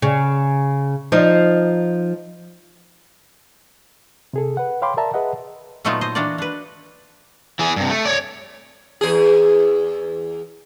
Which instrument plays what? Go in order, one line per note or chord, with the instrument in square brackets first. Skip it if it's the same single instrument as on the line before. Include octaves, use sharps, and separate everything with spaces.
[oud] C#3
F3 D#4
[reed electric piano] C3 G#4 A4
B4 F#5
C#5 F5 G5 B5 C6 D6
A#4 D5 E5 A5 A#5
G#4 B4 D#5 E5 F#5
[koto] A#2 F#3 A3 B3 D#4 F4
C5 D#5
E3 A#3 D4 F#4 D5
D4 B4
[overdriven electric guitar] E3 G#4
G2 C3
A3
C#5 D5
[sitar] E2 G#4